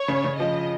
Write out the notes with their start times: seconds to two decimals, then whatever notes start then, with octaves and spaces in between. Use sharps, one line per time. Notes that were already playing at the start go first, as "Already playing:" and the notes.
Already playing: C#5
0.08 C#3
0.24 C#3
0.39 F3 D#5